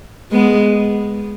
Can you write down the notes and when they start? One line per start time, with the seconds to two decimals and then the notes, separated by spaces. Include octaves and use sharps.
0.32 G#3 B3